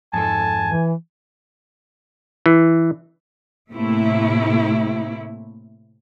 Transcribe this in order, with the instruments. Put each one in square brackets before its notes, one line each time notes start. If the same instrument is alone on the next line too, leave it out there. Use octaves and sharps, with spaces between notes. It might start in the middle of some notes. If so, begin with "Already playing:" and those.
[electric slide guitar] F2 G#2 A4 [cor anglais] G#5 [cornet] A5
[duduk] E3
[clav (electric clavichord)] E3
[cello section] A2 C3 A3 A#3 E4